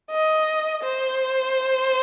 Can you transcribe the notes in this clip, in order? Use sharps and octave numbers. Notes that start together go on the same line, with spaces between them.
D#5
C5